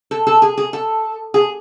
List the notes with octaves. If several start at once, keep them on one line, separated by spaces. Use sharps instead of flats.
A4
A4
G#4
G#4
A4
G#4